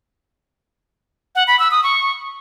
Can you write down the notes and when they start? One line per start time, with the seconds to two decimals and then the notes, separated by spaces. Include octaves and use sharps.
1.35 F#5
1.47 B5
1.59 E6
1.71 D#6
1.83 C#6